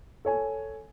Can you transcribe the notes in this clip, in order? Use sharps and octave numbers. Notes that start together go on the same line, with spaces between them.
A4 C#5 G#5